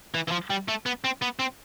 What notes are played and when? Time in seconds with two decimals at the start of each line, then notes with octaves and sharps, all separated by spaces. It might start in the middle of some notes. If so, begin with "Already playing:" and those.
0.14 E3
0.28 E3
0.31 F3
0.50 G3
0.68 A3
0.86 B3
1.04 C4
1.22 B3
1.39 C4